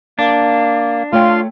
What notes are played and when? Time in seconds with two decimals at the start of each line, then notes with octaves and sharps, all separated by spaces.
0.19 A#3 D4
1.13 A3 F4 C#5 F5 G5 C6